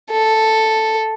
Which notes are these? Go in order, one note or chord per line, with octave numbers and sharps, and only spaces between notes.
A4